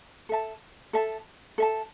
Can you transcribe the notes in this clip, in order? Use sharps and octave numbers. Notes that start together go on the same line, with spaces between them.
A4 E5 A5
A4 E5 A5
A4 E5 A5